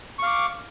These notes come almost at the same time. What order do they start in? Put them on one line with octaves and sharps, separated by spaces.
C#6 F5 D6